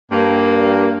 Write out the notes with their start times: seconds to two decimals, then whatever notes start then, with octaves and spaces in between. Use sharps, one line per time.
0.12 G2 A#3